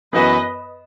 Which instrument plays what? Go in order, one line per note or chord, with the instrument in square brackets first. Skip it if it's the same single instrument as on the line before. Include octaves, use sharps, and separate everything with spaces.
[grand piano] F#2 E3 B3 F#4 [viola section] B4 D#5